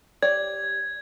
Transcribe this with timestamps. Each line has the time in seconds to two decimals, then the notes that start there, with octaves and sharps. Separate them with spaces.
0.22 G4 C#5 D5 G#6